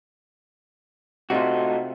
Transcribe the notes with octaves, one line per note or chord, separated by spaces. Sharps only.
C3 A3 D#4 F4 F#4